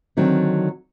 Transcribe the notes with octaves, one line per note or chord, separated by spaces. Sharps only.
D3 D#3 F#3 C4 D4